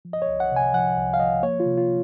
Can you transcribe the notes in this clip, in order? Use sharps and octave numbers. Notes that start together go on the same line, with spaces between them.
F3
D#5
C#5
C2
F#5
C3 G#5
F3 F#5
C2
F5
F3 D#5
A#3 C#5
F4
C3
F4